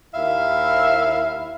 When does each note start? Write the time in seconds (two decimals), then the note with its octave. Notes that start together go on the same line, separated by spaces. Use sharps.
0.13 D#2 E4 E5 F5